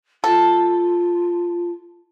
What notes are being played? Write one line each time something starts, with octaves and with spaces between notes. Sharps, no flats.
F4 A4